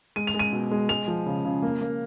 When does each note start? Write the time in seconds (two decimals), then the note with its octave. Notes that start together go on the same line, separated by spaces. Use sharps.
0.16 G#3 D#7
0.27 F7
0.34 G#3
0.39 D#7
0.53 B2
0.71 G#3
0.89 G#3 F7
1.08 F3
1.26 C#3
1.45 C#3
1.63 A#3
1.81 A#3